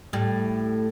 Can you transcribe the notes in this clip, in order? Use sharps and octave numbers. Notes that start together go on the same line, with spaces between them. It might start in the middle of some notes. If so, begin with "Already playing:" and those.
A2 G3